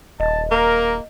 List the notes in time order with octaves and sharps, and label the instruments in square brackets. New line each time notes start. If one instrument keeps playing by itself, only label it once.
[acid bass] D#1 [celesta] D#5 [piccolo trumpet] A5
[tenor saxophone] A#3 [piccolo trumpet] A#4